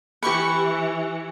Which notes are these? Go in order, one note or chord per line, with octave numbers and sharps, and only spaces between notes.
E3 G4 B4 C#6 C#7